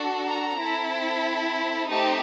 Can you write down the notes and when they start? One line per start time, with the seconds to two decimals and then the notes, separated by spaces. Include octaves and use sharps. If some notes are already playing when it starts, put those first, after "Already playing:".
Already playing: D4 F#4 A4
0.27 A#5
0.59 C4 E4 A4
1.89 A3 C4 D#4 G4 A5